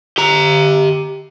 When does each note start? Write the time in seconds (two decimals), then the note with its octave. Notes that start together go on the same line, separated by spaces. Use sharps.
0.18 G4 A#5